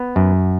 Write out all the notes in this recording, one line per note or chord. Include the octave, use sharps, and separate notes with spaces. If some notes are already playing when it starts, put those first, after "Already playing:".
Already playing: B3
F#2